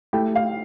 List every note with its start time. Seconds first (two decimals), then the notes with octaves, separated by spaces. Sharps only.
0.13 A3 E4 G4 G5
0.35 F5